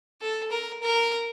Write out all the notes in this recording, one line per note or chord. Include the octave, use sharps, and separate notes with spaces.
A4
A#4
A#4